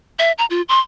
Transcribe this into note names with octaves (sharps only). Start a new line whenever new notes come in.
E5
A#5
F4
C6